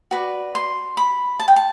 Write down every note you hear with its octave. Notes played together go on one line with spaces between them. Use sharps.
F#4 B4 D5
C6
B5
A5
G5
A5